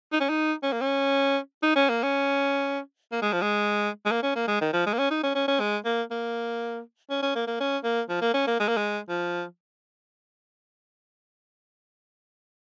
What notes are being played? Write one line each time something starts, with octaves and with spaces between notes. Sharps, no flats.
D#4
C#4
D#4
C#4
A#3
C#4
D#4
C#4
A#3
C#4
A#3
G#3
F3
G#3
G#3
A#3
C#4
A#3
G#3
D#3
F3
G#3
A#3
C#4
D#4
C#4
C#4
C#4
G#3
A#3
A#3
C#4
C#4
A#3
A#3
C#4
A#3
F3
A#3
C#4
A#3
G#3
A#3
G#3
F3